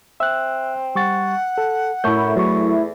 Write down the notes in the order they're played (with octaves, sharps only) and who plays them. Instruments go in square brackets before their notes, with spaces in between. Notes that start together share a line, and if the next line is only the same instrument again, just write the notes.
[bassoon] C4 [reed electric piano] E5 F#6
[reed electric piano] G3 C#6 A6 [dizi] F#5
[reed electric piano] A4
[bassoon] F#2 [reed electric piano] A2 C#6 G6 [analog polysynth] A3 E4
[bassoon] E2 [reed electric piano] F#3 C#6